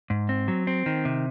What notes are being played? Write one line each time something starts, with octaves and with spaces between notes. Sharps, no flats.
G#2
C4
F#3
C4
D#3
C3